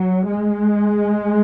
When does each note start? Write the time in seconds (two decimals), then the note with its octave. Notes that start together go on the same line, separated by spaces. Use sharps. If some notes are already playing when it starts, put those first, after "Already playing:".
Already playing: F#3
0.29 G#3